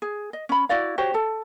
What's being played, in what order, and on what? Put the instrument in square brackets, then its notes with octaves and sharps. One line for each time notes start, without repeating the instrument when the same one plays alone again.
[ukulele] G#4
D#5
C#4 B5
E4 F#4 D5 F5
F#4 G4 C5 C#5
A4 A5